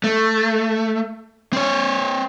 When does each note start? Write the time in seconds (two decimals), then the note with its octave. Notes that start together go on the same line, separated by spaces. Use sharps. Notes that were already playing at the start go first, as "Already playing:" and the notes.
0.04 A3
1.53 C4 C#5